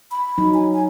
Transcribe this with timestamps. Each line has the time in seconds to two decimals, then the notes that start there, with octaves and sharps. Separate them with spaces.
0.11 B5
0.38 F#3 D#4
0.54 G#5
0.73 G#5